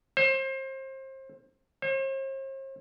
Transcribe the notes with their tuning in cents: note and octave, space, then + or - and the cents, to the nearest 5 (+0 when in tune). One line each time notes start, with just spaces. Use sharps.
C5 +30
C5 +45